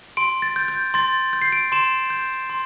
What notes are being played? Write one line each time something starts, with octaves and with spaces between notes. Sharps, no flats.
C6 D7
A6
G6
G6
C6 A6
G6
C7
D7
C6 E7
G6
C6